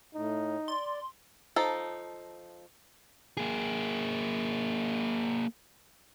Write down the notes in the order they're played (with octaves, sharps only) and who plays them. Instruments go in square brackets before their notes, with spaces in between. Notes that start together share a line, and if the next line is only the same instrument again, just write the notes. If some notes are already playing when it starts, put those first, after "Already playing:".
[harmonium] A2 [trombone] D#4
[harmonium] D5 [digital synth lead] C6
[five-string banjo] F3 D#4 A4
[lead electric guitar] A#3 G#4